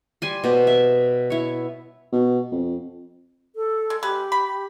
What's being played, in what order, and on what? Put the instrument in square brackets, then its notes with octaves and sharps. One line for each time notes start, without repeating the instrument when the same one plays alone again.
[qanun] G3 G#5 C6
B2 C5 D6
E5
E4 C#5
[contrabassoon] B2
F2
[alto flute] A4
[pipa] G#3
[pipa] G#3 B4 [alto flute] G4
[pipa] B5